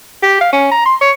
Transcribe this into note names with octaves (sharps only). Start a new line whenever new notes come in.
G4
F5
C#4
A#5
C6
C#5